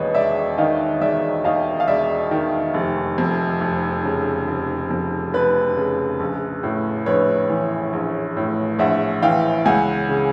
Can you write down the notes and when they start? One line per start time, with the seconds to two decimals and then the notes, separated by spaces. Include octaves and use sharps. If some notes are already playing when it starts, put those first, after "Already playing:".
Already playing: E1 D#2 B4 C#5 D#5
0.15 E1 D5 E5
0.58 D#3 D#5 F5
1.01 E1 D5 E5
1.44 D#2 D#5 F5
1.80 F5
1.88 E1 D5 E5
2.31 D#3
2.74 F1
3.18 F2
3.61 F1
4.04 C#3
4.48 F1
4.91 F2
5.33 F1 B4
5.77 C#3
6.20 A#1
6.63 A2
7.06 A#1 B4 C#5
7.50 E3
7.93 A#1
8.37 A2
8.79 A#1 E5 F#5
9.22 E3 F5 G5
9.65 C#2 F#5 G#5
10.09 C#3